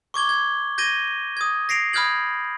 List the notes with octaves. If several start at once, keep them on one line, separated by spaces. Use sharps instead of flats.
C#6 D6 G#6 G7
G#6
G6 G#6 A#6 D#7 G7
D#6 G#6
A#6 C7 D7 F7
B5 D#6 F6 G6 G#6 F#7